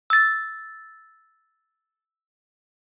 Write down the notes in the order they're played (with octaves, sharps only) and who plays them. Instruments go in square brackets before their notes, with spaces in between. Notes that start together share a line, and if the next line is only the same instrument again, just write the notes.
[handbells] E6 A6